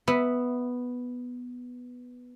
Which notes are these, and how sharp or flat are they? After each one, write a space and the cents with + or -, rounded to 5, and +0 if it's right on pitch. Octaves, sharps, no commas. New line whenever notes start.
B3 +0 E5 -5